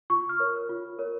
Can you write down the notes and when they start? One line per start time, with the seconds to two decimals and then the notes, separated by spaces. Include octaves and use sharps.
0.10 F4 C#6
0.29 F6
0.40 A#4 C#5
0.69 F4
0.99 A#4 C#5